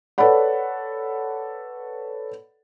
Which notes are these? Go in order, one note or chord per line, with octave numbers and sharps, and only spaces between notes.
A4 B4 C#5 D5 F#5 B5